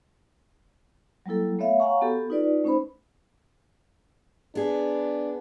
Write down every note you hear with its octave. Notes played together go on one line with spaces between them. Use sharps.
F#3 G3 A#3 E4 A4
A3 B3 C#5 E5 F5
C#5 F5 F#5 G#5 A#5 C#6
B3 F#4 G4 A4
D#4 F4 B4 D5
A3 C#4 D#4 C5 B5
B3 D4 G#4